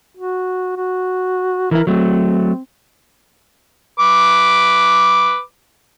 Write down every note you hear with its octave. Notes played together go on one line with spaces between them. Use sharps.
F#4
F#4
E3 E4 A#4
F#3 A3 C4
B4 D6